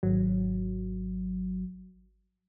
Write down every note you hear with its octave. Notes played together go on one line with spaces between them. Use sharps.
G#1 F#3